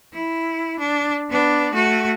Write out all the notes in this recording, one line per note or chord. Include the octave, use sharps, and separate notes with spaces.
E4
D4
B3 D4
A3 F#4